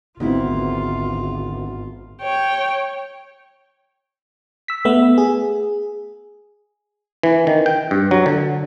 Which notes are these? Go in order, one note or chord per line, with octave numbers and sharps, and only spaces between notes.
G#1 D2 B3 C4 E4 F4
C#5 G5
E6 B6
A3 B3 E5 E6
G#4
E3
D#3
G5
G2
F#3
D3